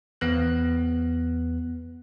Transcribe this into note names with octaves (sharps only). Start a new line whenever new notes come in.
E2 B3 F#6